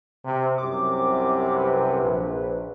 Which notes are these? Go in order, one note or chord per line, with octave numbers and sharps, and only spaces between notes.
C3
C2 F#2 C3 D6
B4
A#1